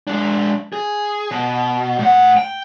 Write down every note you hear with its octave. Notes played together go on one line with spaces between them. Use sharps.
G#3 D4
G#4
B2
A2 F#5
G5